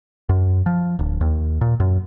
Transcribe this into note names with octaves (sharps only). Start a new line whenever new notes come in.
F#2
F3
D1
D#2
A#2
F#2